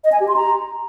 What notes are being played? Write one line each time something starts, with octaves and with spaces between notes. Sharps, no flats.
D#5
G#5
G4
C6
A#5